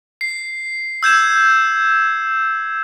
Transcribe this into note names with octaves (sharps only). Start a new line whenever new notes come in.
C7
E6 G6 G#6 E7